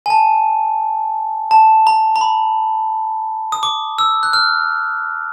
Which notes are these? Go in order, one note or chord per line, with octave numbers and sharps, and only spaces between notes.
G#5
A5
A5
A#5
A#5
B5
D#6
D6
E6
F#6
F6